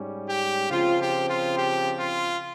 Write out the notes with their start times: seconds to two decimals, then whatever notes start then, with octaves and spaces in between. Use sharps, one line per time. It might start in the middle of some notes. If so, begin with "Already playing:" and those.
Already playing: G#2 G3 C#4
0.27 G4
0.69 C#3 F3 C4 F4
0.98 G4
1.27 F4
1.54 G4
1.98 F4